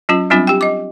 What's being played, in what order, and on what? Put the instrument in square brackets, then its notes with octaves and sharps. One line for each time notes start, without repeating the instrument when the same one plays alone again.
[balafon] F#3 C#4 F4
F#3 G3 C4 D4 F4
G4 G5
D#5 D6